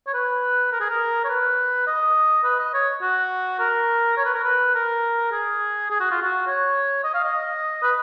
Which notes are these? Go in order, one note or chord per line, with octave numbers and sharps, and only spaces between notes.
C#5
B4
A#4
G#4
A#4
C#5
B4
D#5
B4
D#5
C#5
F#4
A#4
C#5
B4
A#4
B4
A#4
G#4
G#4
F#4
F4
F#4
C#5
D#5
F5
D#5
B4